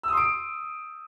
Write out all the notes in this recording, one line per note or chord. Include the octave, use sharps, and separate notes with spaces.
C6 D#6 E6 D7